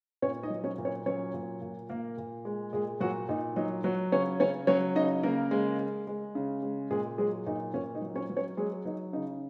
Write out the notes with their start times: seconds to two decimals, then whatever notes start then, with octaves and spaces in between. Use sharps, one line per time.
0.22 A#2 C#4 C#5
0.43 D#4 D#5
0.50 F#3
0.64 C#4 C#5
0.78 A#2
0.85 C#4 C#5
1.06 F#3 C#4 C#5
1.34 A#2
1.62 A#2
1.89 A#2 A#3 A#4
2.18 A#2
2.45 G#3
2.73 A#2 G#3 G#4
3.00 A#2 F#3 F#4
3.29 A#2 D#4
3.56 F#3 D#4
3.84 F#3 F#4
4.12 C#3 C#4 C#5
4.40 C#3 C#4 C#5
4.67 F#3 C#4 C#5
4.96 C#3 D#4 D#5
5.23 C#3 A#3 A#4
5.51 G#3
5.79 G#3
6.07 G#3
6.35 C#3
6.63 G#3
6.91 A#2 G#3 G#4
7.18 F#3 G#3 G#4
7.46 A#2 D#4
7.74 A#2 C#4
7.95 D#4
8.02 F#3
8.15 C#4 C#5
8.30 F#3
8.37 C#4 C#5
8.57 F#3 G#3 G#4
8.85 F#3 D#4
9.13 C#3 D#4